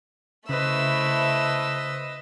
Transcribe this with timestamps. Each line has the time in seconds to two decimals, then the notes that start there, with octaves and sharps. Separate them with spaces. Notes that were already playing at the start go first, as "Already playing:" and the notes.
0.49 C#3 A3 E4 B4 C5 D#5 E6